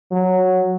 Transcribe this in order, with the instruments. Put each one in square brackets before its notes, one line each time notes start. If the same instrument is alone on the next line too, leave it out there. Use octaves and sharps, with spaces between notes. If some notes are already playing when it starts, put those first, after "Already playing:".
[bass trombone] F#3